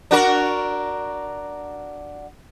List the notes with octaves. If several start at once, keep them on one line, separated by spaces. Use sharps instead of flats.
D4 F#4 A#4